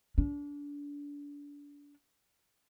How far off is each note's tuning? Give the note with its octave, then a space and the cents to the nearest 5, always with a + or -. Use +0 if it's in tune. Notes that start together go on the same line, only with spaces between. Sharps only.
D4 -30